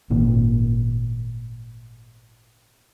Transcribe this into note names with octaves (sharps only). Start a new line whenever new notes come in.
G#1 A#2 D#3 A#3